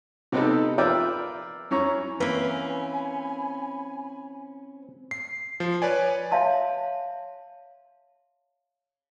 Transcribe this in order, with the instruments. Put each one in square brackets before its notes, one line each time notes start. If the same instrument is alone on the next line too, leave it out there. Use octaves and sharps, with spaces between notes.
[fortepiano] C3 B3 C4 D#4 G4 A4
F4 A#4 B4 D5 E5 G5
F#2 C#4 E4 A#5 C#6
[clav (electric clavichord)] E3 A#3 [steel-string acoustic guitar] C4 C#4 [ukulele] B4 [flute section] G#5 B5
[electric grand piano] C7
F3
B4 C#5 D5 G#5
[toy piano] C#5 E5 F5 A5 C6